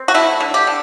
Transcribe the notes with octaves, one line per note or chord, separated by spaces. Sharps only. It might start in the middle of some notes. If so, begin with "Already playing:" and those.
Already playing: C4
F#4
A3 E4
D3
G4
D3